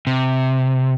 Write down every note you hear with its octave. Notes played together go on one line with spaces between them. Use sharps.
C3